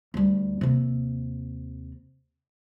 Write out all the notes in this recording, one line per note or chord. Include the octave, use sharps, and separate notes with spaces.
D2 G3
D#2 C3